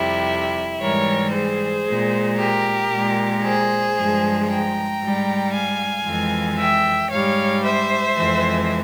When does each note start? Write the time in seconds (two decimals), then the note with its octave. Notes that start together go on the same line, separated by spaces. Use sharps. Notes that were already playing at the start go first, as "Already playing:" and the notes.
Already playing: F2 C3 G3 E4
0.80 G#2 E3 G3 A#4 C#5
1.33 G#4 C5
1.85 A#2 G#3
2.38 G4 A#4
2.90 A#2 G#3
3.42 G#4 C5
3.95 G2 F3 G#3
4.47 G5 A#5
5.00 G#2 G3
5.53 F5 G#5
6.05 F2 E3 G#3
6.57 E5 G5
7.10 G#2 G3 C#5 F5
7.62 C5 E5
8.15 F2 E3 G#3